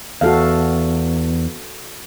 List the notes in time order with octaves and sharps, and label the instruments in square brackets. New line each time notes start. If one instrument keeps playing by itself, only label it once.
[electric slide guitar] E2 [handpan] F#4 A4 F5